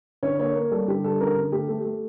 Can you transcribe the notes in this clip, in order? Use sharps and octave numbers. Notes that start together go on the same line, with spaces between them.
D3 C#5
A#3 C#5
A#3 A#4
G3 A4
D3 G4
G3 A4
D3 A#4
D3
A3 G4
A3
A3